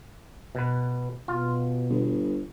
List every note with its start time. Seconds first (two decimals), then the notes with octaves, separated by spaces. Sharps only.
0.55 B2 B4
1.28 B2 F4
1.89 G1